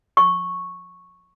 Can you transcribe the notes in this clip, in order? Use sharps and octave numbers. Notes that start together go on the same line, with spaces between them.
C#6